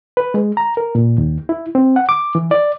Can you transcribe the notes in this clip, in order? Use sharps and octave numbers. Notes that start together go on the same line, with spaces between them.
B4
G#3
A#5
A#4
A#2
D#2
E4
C4
F#5
D6
E3
D5